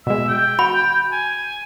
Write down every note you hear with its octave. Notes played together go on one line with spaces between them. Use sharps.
B2 G#3 E5
G5
F#4 B5
G#5